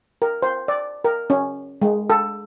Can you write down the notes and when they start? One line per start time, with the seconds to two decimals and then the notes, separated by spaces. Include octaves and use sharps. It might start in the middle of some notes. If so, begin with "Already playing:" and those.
0.22 A#4
0.42 C5
0.68 D5
1.04 A#4
1.30 C#4
1.82 G#3
2.10 A4